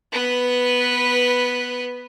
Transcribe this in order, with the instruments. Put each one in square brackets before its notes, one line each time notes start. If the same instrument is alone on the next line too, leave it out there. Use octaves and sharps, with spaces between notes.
[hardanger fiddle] B3 B4